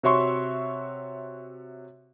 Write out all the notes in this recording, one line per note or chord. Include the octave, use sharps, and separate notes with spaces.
C3 F#4 C#5 E5 C6 C#6